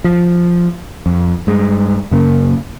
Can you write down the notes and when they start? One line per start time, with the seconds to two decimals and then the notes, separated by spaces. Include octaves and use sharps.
0.04 F3
1.06 F2
1.47 G2 G#3
2.11 F#2 C#3 A#3